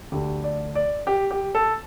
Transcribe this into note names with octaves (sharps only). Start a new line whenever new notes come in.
D2 D3 A3 G4
D5
D5
G4
G4
A4